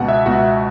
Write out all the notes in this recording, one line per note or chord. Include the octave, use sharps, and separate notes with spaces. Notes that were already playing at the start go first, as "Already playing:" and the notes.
Already playing: C#2 B2 F#5
E5
C#2 B2 F#4